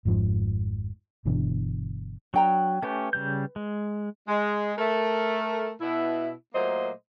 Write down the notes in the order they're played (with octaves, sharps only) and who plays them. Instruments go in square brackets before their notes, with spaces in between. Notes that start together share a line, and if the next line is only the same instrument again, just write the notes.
[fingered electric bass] G#1 F2 G#2 F3
G1 B2 E3 D4
[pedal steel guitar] F#3 [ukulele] D4 G5 A#5
[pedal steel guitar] A3 C#4 G4 [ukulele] B4
[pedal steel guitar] C#3 G3 G6
G#3
[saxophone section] G#3
A3 A#4
B2 E4
A#2 F#3 A3 A#3 C5 D#5